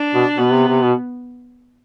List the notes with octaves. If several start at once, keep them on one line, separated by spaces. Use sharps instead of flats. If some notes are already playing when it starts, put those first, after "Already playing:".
Already playing: D4
B2
B2 B3
C3
C3
B2